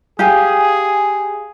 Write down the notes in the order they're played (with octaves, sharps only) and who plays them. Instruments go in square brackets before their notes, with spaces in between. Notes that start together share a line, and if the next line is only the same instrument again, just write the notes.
[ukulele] G4 F5 G#5 [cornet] G#4